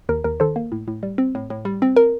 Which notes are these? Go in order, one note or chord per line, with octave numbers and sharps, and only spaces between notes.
D#2 A#4
D#2 A#4
D#3 A4 C5
A#3
A2
A2
G3
C4
A2
A2
G3
C4
A#4